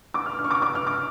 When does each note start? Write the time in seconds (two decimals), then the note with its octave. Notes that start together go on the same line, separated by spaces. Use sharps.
0.14 D6
0.26 F6
0.39 F6
0.44 C#6
0.51 D6
0.62 D6
0.75 F6
0.87 D6